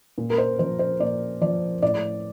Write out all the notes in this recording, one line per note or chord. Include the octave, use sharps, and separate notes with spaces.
A#2
A#4
C5
F3 C5
C5
A#2 D5
F3 D5
A2 D5